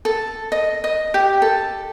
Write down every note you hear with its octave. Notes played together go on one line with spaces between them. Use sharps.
A4
D#5
D#5
G4
A4